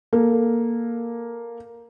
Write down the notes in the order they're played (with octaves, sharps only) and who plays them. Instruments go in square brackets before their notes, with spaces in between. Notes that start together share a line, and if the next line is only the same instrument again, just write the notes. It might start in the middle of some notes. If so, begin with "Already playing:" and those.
[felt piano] A#3 A4